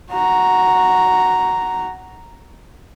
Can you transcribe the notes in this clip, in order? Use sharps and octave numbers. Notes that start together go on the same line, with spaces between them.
F#4 A#5